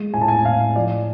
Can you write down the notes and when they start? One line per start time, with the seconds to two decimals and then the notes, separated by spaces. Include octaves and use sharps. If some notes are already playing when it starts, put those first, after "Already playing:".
Already playing: G#3
0.14 A2 G#5
0.21 A5
0.28 G#5
0.45 A2 F5
0.76 F3 D5